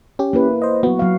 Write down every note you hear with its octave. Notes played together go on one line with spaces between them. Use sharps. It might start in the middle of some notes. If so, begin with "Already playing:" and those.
C#4 G4
A#3 E4 B4
C5 D#5
F#3 B3 F#4
F#3 F5